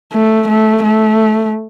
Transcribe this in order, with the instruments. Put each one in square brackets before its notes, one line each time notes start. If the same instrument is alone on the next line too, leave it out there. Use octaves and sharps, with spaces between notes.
[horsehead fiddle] A3
A3
A3